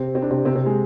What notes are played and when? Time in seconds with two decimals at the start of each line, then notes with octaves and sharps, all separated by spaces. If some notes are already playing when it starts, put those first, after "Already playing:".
Already playing: C3 C4
0.15 C4
0.22 D4
0.31 C3 C4
0.45 C3 C4
0.56 C3 C4
0.66 G#3